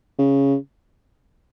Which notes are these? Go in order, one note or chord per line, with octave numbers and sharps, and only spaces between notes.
C#3